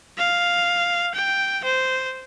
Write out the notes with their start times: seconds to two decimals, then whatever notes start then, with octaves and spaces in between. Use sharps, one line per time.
0.18 F5
1.15 G5
1.64 C5